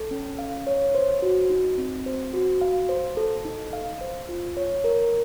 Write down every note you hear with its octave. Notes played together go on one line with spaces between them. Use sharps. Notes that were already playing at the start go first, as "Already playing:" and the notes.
Already playing: A4
C#4
F5
C#5
C5
F#4
D#4
C4
C5
F#4
F5
C5
A4
D#4
F5
C5
F4
C#5
A#4